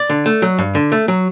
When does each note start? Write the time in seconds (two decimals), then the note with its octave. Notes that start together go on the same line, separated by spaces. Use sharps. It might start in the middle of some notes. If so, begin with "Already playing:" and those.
Already playing: D5
0.10 D3
0.26 A3
0.42 F#3
0.59 G2
0.75 D3
0.92 A3
1.08 F#3